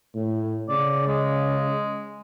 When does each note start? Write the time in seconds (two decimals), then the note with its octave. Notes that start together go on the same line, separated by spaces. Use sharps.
0.15 A2
0.69 C#3 D5
1.07 G#3